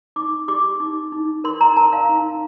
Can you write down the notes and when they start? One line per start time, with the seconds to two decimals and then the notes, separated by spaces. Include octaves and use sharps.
0.16 D#4 D6
0.48 G4 D6
0.80 D#4
1.12 D#4
1.44 A#4 C6
1.61 A#5
1.76 A#4 A5
1.93 F5
2.09 D#4